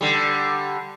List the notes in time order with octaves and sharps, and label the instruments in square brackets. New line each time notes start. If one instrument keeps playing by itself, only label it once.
[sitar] D3 G3